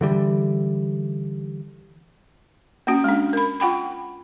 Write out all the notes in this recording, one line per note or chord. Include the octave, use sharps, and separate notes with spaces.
D3 E3 G3
A#3 C#4 F#4
G#3 D4
A#4 B5
F4 F#5 G5 B5